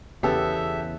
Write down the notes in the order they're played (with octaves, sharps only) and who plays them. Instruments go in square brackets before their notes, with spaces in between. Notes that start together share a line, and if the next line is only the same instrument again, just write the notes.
[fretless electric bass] E2 C#3 [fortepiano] B3 [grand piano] G4 A4 [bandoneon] E5